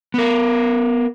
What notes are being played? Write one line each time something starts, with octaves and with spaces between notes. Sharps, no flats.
B3 A#4